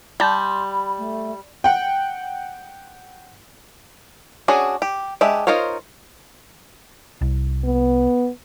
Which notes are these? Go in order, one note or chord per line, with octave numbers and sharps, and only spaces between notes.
G3 A5 C6 G6
B5
A3
F#5 G5
C#4 D4 F#4 G#4
G4
G#3 D4 G4 E5
D#4 F4 A#4 C5 C#5
C2
B3